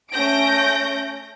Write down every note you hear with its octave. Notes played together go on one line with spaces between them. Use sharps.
A3 C#4 G6 A#6 D7